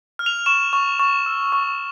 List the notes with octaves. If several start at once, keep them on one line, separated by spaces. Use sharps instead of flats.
F6
F7
C#6 E7
C#6
C#6
E6
C#6